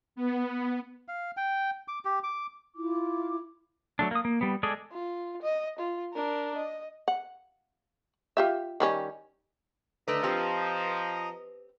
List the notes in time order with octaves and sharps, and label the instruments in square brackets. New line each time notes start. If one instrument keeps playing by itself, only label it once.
[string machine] B3
[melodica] F5
G5
D6
G4
D6
[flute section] E4 F4 D6
[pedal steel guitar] F#3 A3 D4
A#3 D#6
A#3
G3 B3
G#3 G#4 A4 D5 D#5
[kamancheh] F4
D#5
F4
D4 A#4
D#5
[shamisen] F#5
F4 G4 E5
D#3 G3 C#4
[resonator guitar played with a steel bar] D3 A3 D4 [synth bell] B4 [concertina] D#5 A#5 D#6
[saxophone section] F3 [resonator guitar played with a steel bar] C4 G4